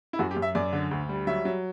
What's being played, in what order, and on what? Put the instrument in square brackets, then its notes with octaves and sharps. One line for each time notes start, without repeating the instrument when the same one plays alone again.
[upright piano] E4
F#2 F#4
G4
F#2
E5
F#2 D5
D3
D2
G3
F#3 E5
F#3